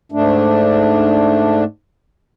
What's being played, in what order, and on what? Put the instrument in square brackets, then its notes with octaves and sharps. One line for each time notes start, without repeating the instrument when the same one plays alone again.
[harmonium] G#2 A3 D4